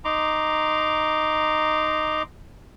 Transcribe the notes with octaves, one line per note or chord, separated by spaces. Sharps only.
D#4 A#5 C6 D6